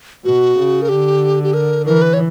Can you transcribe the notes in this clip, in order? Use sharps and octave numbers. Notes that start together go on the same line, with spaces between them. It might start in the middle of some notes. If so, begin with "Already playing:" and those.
B2 F#4
C#3
A#4
D3 G4
G4
A#4
E3 A#4
B4
C#5